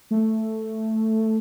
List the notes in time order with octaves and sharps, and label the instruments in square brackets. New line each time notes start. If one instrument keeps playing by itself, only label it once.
[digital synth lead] A3